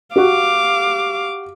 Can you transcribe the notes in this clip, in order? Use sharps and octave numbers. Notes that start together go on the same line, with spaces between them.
F#4 G4 F5 D6